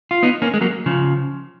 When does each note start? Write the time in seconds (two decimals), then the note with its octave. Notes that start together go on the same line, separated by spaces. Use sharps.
0.11 F4
0.23 B3 D#4
0.42 A#3 C#4
0.54 G#3
0.61 F#3 A#3
0.86 C#3 F3